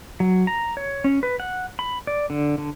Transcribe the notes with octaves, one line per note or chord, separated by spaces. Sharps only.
F#3
A#5
C#5
C#4
B4
F#5
B5
D5
D3
D3